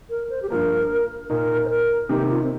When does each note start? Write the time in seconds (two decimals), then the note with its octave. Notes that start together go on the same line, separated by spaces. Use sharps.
0.10 A#4
0.30 C5
0.42 G4
0.50 G2 F3 A#3 A#4
1.30 A#2 A#3 D#4 A#4
1.65 C5
1.70 A#4
2.09 C3 D#3 A#3 D#4 G4
2.30 F4
2.43 C4